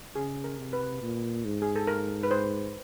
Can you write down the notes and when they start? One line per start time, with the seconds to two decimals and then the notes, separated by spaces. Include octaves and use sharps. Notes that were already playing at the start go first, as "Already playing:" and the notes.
0.16 C#3 G#4
0.44 A#4
0.59 C3
0.73 B4
1.02 A#2
1.45 G#2
1.62 G#4
1.76 A4
1.87 A#4
2.23 B4
2.31 C5